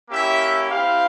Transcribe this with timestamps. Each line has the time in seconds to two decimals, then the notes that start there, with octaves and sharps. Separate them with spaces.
0.10 A#3 C#4 E4 G4 E5
0.70 C4 E4 G4 F5